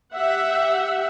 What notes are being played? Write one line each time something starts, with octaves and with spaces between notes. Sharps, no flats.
G4 E5 F#5